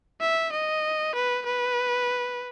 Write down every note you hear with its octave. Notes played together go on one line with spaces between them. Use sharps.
E5
D#5
B4
B4